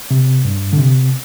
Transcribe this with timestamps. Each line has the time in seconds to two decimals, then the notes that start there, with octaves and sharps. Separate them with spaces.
0.11 C3
0.45 G2
0.73 D3
0.78 C3